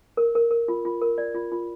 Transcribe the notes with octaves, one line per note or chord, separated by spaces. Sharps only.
A#4
A#4
A#4
F4
F4
A#4
D5
F4
F4